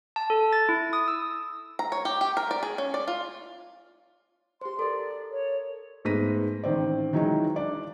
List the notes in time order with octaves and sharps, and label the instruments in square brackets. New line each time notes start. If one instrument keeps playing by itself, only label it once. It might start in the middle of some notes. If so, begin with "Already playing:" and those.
[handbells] A5
A4
A6
E4
D#6
E6
[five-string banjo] A#5
C#5
G4
G4
A#4
D5
G#4
C#4
D5
F4
[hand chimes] G4 C5 [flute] C6
[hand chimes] A4 A#4 [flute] D5
[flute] C#5
[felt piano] G#2 A3 B3 A#6 B6 D#7
A1 D#3 C4 D5
D#3 E3 F#3 G#3 D#4
D4 D5